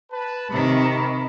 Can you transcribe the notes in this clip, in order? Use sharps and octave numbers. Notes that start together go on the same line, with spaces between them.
B4 A5
C3 D#3 B5 C#6